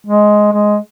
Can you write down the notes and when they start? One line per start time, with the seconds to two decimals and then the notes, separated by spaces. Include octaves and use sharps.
0.07 G#3
0.53 G#3